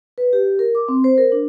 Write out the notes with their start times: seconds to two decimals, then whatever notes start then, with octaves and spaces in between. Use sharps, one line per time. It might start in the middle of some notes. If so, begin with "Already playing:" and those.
0.18 B4
0.33 G4
0.59 A#4
0.75 D6
0.88 C4
1.04 C5
1.18 A#4
1.32 D4